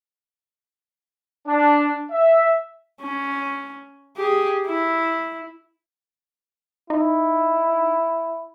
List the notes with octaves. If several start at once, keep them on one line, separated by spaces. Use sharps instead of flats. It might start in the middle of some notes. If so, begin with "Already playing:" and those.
D4
E5
C#4
G4 G#4
E4
D#4 E4